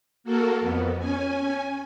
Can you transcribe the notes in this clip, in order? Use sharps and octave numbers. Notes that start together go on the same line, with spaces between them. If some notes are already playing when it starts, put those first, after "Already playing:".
A#3 F#4 A4 A#4
F2 B3
C#4 G#5